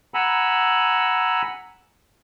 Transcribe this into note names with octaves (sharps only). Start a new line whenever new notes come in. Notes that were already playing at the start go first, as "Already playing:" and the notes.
F#5 G#5 A#5 B5 E6